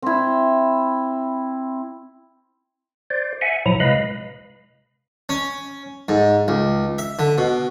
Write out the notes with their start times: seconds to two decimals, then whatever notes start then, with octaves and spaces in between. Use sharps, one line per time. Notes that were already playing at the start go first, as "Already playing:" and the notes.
0.02 C4 E4
3.10 C5 D5
3.41 E5 F#5 G#5
3.66 A#2 F3 F#3 E4 A#5
3.80 C3 G#3 B4 D#5 F5 B5
5.29 C#4
6.08 G#2
6.48 C#2
6.98 E5
7.19 D3
7.38 B2